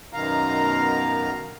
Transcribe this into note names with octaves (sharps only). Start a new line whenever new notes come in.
F#2 B2 D#3 F5 A#5